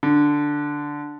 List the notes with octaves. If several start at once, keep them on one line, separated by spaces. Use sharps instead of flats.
D3